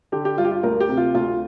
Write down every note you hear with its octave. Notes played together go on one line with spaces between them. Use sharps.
D3 G4
G4
G2 F4
G4
F4
D2 A#4
G4
C3
F4
D2 F4